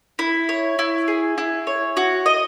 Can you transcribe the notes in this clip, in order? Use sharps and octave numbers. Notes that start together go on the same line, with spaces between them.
E4
C#5
E4
G#4
E4
C#5
F#4
D#5